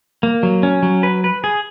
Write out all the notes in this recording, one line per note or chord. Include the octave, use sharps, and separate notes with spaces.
A#3
F#3
C#4
F#3
B4
B4
G#4